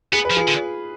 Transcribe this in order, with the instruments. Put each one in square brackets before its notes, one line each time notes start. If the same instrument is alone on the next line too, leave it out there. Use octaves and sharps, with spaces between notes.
[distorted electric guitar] B3 [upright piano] G#4
[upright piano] B4
[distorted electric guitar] F3
[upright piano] F4 G#4
[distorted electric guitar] D3